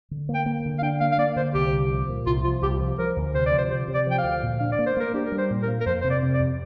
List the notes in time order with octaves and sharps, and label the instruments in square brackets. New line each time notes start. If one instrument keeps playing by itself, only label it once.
[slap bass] D3
A#3
[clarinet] G5
[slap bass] A#3
D3
[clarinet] F5
[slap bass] D4 [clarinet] G5
[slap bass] A#3 [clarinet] F5
[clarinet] F5
[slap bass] A#3 [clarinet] D5
[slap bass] D3 [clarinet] C5
[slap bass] C2 [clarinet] G4
[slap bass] C2
F3
A#2
[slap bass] C2 [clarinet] F4
[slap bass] F3 [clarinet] F4
[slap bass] C2 [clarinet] G4
[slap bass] F3
[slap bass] F3 [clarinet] A#4
[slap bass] D2
[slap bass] C3 [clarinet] C5
[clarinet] D5
[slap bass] F3
[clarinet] C5
[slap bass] C3 [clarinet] C5
[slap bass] C3
[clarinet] D5
[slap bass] F3 [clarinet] G5
[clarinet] F5
[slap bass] D2
A#2
[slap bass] D4 [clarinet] F5
[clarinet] D5
[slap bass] A#3
[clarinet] C5
[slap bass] A#3 [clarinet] A#4
[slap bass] D4 [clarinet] G4
[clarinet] A#4
[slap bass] G3
[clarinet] C5
[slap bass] A#2
[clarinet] A#4
[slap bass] A#3
[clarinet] A#4
[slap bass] F2 [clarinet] C5
[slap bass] C3 [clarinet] C5
[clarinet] D5
[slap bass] C3
[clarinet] D5
[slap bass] F2